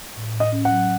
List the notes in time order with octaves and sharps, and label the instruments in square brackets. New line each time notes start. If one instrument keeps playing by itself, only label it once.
[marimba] A2
A2
[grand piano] D#5
[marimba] C#4
[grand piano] F#5
[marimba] F#3